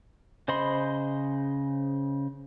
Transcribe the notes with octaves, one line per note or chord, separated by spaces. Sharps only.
C#3 C5 D#5 B5 C6